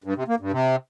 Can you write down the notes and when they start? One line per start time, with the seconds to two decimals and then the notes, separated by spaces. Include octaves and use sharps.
0.04 G2
0.16 C3
0.28 A#3
0.40 G2
0.52 C3